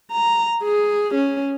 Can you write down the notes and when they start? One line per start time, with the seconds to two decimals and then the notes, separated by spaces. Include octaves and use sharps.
0.12 A#5
0.63 G#4
1.14 C#4